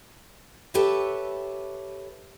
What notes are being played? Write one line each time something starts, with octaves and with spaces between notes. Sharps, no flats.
G4 A4 B4 C#5 E5